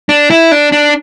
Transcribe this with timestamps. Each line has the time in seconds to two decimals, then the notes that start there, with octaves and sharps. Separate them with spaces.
0.09 D4
0.31 E4
0.52 D4
0.72 D4